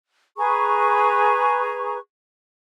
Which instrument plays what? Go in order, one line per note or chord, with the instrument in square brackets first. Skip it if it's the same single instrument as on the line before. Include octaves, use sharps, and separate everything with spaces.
[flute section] G#4 B4 A#5 C#6